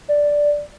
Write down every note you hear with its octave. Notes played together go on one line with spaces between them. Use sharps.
D5